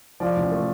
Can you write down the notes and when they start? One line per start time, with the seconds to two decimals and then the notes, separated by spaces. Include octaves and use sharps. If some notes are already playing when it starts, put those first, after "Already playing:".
0.20 F3 D5
0.36 A1
0.51 A3